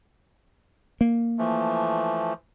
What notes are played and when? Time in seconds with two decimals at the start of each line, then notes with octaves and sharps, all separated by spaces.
1.01 A#3
1.38 E3 F3 A3